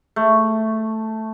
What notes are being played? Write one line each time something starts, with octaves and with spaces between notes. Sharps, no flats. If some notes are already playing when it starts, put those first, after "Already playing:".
A3